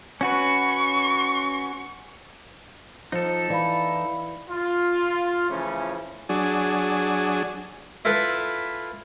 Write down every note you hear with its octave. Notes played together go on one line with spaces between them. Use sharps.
C#4 F#4 B4 C#6
F3 D#4 A4
E3 D5 F5 B5
F4
C#3 E3 F3 A3 C#4
F#3 D4 G#4
E4 F4 A4 B4 A5